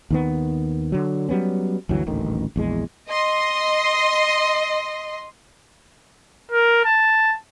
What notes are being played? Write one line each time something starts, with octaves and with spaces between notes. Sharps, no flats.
D#2 D#3 B3
D3 F#3
F#3 G3 B3 C#4
G1 D2 E3 F#3
D#1 A1 D2 D#3
A#1 E2 G#3
D#5 C6
A#4
A5